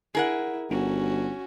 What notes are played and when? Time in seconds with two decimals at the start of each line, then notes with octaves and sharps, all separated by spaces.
0.15 E4 G#4 A#4 F#5
0.70 G1 C#4 F#4